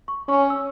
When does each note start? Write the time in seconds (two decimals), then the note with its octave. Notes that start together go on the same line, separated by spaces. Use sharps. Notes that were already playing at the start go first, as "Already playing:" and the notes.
0.08 C#6
0.28 C#4 C#6
0.50 E6